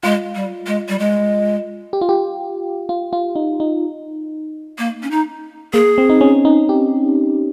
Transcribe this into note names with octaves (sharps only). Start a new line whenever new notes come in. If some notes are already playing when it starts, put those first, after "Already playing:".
G#3 F4
G3
G#3
G3
G#3
G4
F4
G4
F4
F4
D#4
D#4
A#3
C#4
D#4
A#3 G#4
C4
D#4
C#4
D#4
G4